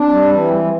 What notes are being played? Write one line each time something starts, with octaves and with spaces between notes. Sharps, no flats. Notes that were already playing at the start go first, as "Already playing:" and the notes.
Already playing: C4 D4
G3
E3